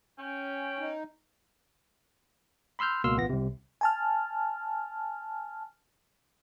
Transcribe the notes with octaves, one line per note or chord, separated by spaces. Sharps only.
C#4 G5
D#4
B5 C6 E6 F6 G6
C#2 B2 A#3 C6 E6 F6
A1 B3 F4 A#6
C2 C3
G#5 A5 F6